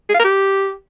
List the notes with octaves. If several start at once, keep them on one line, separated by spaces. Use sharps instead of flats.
G#4
F5
A#4
G4